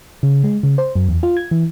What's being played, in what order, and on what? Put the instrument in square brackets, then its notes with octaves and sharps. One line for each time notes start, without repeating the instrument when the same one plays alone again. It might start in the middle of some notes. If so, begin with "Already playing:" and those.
[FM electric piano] C#3
G#3
C#3
C5
F#2
E2
F4
G#6
E3